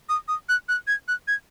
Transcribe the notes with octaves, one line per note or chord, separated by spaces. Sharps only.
D#6
D#6
F#6
F#6
G#6
F#6
G#6